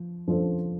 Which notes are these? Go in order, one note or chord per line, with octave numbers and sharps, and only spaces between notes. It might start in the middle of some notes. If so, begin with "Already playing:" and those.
Already playing: F3
F3 D4 A4 C5